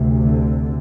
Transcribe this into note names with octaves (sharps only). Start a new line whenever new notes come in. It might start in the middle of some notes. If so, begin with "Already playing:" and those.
Already playing: D2 C3
D3